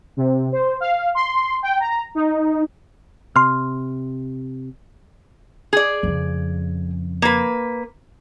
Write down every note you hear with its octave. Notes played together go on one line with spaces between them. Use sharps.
C3
C5
F5
C6
G5
A#5
D#4
C3 C6 F6
G#4 D5
F2 C#3
A#3 B4